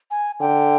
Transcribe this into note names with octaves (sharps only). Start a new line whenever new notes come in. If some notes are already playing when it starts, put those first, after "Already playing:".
G#5
D3 G5